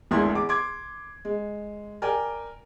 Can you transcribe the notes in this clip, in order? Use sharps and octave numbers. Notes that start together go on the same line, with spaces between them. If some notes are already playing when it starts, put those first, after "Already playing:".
G#1 D2 E4 G#4 C6
E2 D6
C6 D6 G#6
G#3
A#4 D5 G5 G#5